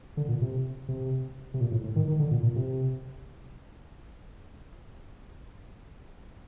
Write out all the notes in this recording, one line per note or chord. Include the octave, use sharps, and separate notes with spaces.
D3
A#2
C3
C3
C3
A#2
A2
A2
D#3
D#3
D3
A#2
A#2
C3